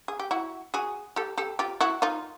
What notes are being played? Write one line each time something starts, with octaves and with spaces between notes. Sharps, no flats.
G#4
G4
E4 F#4
F#4 G#4
G4 A4
G4 A4
F4 G4
E4 F#4
D#4 F4